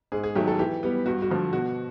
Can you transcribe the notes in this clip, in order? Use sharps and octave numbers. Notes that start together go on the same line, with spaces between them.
G#2 G#4
G#4
D#3 F#3 A3 G4
A4
E3 G4
G3 B3
G2 F#4
F#4
D3 F3
B2 F#4